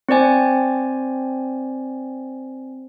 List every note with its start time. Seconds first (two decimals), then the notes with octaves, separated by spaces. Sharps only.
0.09 C4 C5 D5 G#5